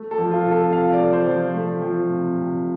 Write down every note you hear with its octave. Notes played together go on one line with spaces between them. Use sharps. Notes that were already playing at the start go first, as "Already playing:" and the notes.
Already playing: A3
A4
F3
F4
C3
A4
C3 F5
D5
A3
C5
F3
A3
F3
C3
C3